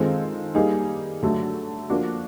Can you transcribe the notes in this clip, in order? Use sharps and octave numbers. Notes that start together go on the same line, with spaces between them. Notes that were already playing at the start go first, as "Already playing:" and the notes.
Already playing: D#3 G#3 C4 F4 A4
G3 A#3 D#4 G#4
D3 F#3 A3
F3 A#3 D4 F#4